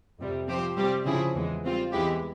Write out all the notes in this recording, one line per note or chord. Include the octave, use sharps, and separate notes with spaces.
F2 C3 G3
F3 C4 G4 C5
C3 G3 C4 G4
C#3 F3 C4 E4 G#4
E2 E3 G#3
G3 C4 F4
E2 E3 G#3 E4 G4